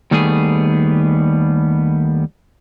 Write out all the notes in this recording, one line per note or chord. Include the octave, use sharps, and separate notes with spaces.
D#2 D#3 G3 A3 B3 G#4